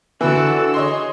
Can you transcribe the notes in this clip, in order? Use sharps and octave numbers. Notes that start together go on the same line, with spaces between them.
D3 E3 F#4 A4 E6
G#4 C#5 D#5 C6